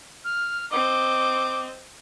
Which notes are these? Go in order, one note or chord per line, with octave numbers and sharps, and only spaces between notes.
F6
C4 D#5 D6